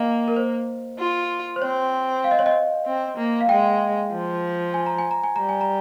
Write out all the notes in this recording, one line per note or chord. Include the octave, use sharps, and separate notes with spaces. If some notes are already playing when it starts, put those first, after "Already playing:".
Already playing: A#3 D#5 F5 G5
A#4
C5
F4
C5
C4 C#5
F5
D#5
C#5
D#5
C4
A#3
F5
G#3 G5
F3
G#5
A#5
G#5
A#5
G#5
G3 A#5
G#5
A#5